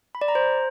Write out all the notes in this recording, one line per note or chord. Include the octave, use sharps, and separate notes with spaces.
B5
D5
A#5
C5